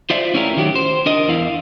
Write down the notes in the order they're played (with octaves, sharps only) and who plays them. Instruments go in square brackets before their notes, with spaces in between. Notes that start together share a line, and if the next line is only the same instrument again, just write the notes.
[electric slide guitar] F4 C5 D5 E5 F5
A3 C#4 E4 F4 G4 A#4
D#3 F#3 G4
C5
D4 A#4 D#5
E2 E4 F5